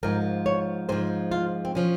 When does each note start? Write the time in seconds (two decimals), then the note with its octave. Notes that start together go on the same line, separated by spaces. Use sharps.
0.03 G#2 F3 A#4
0.46 C#5
0.89 G#2 F3 C5
1.31 F4
1.65 C4
1.75 F3 C#4